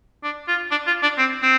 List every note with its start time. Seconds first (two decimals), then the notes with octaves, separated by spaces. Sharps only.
0.23 D4
0.48 F4
0.71 D4
0.87 F4
1.02 D4
1.18 C4
1.42 C4